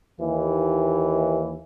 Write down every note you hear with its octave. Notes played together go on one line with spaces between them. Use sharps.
D#2 E3